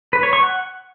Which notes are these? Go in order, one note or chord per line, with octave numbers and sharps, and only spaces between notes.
B4
C#5
C#6
F#5